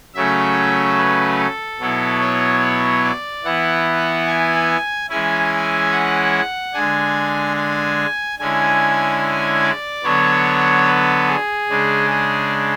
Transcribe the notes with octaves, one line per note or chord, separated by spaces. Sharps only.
C#3 F#3 A3 C#4 E5
B4
A4
B2 F#3 B3 E4
C#5
D5
E3 B3 E4 F#5
G#5
E3 G#3 C#4 E4 G#5
F#5
D3 G#3 D4 G#5
G#5
D3 G#3 C#4 E4 G#5
D5
D3 F#3 B3 D4 C#5
B4
G#4
C#3 G#3 D4
G#4